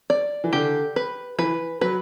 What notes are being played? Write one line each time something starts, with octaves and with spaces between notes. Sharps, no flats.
D5
E3
D3 G4
B4
E3 B4
F#3 B4